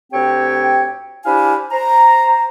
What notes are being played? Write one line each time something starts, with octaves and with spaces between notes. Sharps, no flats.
D2 C4 G4 C#5 G5
D4 E4 G4 C5 F5 G#5
C5 A#5